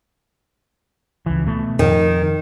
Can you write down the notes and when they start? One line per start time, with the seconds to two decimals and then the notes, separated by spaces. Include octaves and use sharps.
1.26 C#2 E3
1.47 B2 A3
1.79 F2 D#3